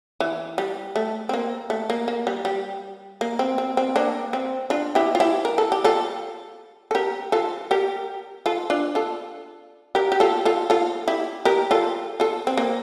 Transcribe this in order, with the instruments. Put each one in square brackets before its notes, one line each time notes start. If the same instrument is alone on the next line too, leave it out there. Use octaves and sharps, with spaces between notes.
[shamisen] E3
G3
A3
C4
A#3
A3
A#3
A#3
G3
G3
A#3
C4
C4
C4
A#3 D4
C4
D4 F4
E4 G4
F4
E4 G4
A#4
A4
G4
F4 A4
A4
G4 A#4
F4 A4
G4 A#4
F4 A4
D4 F4
F4 A4
G4 A#4
G4
F4 A4
F4 A4
F4 A4
E4 G4
G4 A#4
F4 A4
F4 A4
C4
A#3